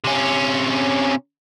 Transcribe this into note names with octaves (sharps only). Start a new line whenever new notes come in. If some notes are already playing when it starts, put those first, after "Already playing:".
C3 C#4